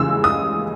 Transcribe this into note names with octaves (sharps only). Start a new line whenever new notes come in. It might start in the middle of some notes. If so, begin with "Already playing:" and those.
Already playing: C#3 E3 G#3 E6
D#6